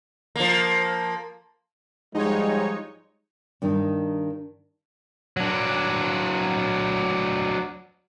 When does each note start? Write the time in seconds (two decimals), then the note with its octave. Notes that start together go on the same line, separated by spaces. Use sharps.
0.36 F3 A#3
2.14 G#2 F3 G3 G#3 D#4 C#5
3.62 G2 D#3 D#4
5.37 F#3 D4